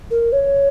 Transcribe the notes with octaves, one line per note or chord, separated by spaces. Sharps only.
A#4
C#5